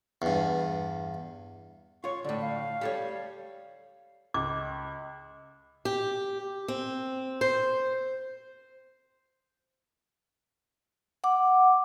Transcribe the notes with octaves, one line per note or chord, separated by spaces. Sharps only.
E2 G2
F4 C#5 C#6
A2 D3 D5
F5
G3 A4 C#5
C#2 D6
G4
C4
C5
F#5 D6